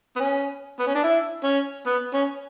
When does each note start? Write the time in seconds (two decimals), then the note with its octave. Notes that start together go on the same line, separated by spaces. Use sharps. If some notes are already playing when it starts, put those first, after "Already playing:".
0.16 B3
0.20 C#4
0.80 B3
0.87 C#4
0.95 D4
1.04 E4
1.44 C#4
1.87 B3
2.14 C#4